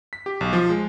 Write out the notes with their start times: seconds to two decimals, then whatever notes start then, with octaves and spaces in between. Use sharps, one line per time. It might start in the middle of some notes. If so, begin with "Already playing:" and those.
0.13 B6
0.26 G4
0.41 B1
0.53 F3
0.70 G#3